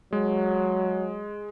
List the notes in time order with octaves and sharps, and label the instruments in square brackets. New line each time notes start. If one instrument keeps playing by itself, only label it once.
[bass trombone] F#3 [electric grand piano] G#3